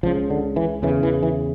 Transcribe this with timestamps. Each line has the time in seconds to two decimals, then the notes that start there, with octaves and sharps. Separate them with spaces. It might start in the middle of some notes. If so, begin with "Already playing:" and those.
0.03 C#2 F3
0.06 C#3
0.30 D3
0.56 E3
0.83 E2 C#3 E3
1.03 E3
1.23 E3